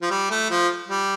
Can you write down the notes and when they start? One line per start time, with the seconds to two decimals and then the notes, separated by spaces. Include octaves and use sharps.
0.02 F3
0.11 G3
0.30 A3
0.50 F3
0.88 G3